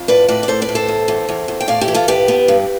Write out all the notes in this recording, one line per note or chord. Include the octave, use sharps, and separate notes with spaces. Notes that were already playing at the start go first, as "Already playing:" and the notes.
Already playing: F2
A2 B4 D5
A2 B4 D5
D5
A2 A4 C5
B4 D5
A2
A4 C5
E2
E2
E2
E2
G5
A2 D5 F5
E4 G4
E3
F4 A4
A2 G4 B4
B3
G2